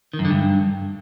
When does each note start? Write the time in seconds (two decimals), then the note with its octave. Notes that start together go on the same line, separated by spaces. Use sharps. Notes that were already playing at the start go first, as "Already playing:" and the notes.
0.13 D#3
0.19 F#2
0.25 D3
0.30 G2